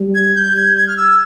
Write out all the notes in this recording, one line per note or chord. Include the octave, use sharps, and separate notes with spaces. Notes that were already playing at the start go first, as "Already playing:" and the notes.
Already playing: G3
G#6
G6
G#6
G#6
F6
E6